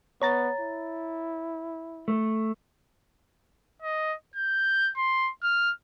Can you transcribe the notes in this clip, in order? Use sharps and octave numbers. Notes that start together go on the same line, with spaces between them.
B3 C#5 A#5 A6
E4
A3
D#5
G6
C6
F6